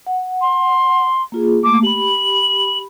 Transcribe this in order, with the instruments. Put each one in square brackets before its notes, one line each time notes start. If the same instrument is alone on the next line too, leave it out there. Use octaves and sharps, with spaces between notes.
[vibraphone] F#5
[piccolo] C6
[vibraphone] A#3 F4 G#4
[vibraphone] A3 A#3 [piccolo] D6
[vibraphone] G4 B5 [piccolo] F#7